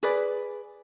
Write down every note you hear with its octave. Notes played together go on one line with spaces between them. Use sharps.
G#4 B4 D5